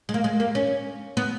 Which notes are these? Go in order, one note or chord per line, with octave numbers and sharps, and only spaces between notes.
G#3
A#3
G#3
A#3
C#4
B3